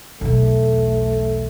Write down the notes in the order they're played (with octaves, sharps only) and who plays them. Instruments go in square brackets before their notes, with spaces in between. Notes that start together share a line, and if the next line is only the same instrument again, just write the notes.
[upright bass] B1 E2 [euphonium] A3